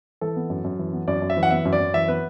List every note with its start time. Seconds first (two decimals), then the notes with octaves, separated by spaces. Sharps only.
0.21 E3 A4
0.36 B3
0.50 F#2
0.64 F#2
0.79 E3
0.93 B3
1.08 F#2 D5
1.22 F#2
1.30 E5
1.37 E3
1.43 F#5
1.51 B3 E5
1.65 F#2
1.73 D5
1.80 F#2
1.94 E3 E5
2.08 B3 B4